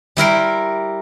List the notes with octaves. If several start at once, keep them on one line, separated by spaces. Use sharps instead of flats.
G3 E4 A#4 C6